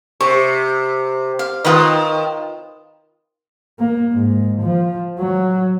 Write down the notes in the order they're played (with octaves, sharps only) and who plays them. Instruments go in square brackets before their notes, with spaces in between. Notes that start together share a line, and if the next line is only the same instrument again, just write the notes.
[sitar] C3 [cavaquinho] C#6
[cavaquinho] F5
[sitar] D#3 [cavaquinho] F4 B4 D#5
[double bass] A#3
G#2
F3
F#3